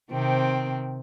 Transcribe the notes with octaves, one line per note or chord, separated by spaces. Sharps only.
C3 D#3 C4